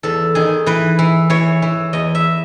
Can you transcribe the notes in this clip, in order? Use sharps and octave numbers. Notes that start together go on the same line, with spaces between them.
E2 A4
D#3 G#4
E3 B4
E3
E3 C#5
E3
E2 D#5
E5